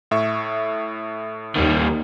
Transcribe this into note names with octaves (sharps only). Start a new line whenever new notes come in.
A2 E5 C#6
D#2 D#3 G3